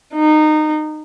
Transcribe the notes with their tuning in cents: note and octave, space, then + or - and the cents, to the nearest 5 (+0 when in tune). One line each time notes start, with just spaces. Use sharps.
D#4 -20